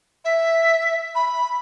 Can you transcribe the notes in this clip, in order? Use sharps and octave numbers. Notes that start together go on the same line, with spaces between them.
E5
B5